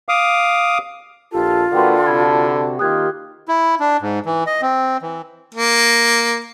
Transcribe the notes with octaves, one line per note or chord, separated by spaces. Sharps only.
F5 D6 D#6
A#1 F4 G4 A4
D3 A#3 F#4 B4 F#5 G5 C6
C3 F#4 A5 B5 G#6
D#3 A#3 F4 G4 D#6 F#6 G#6
E4
D4
G#2
E3
D#5
C4
E3
A#3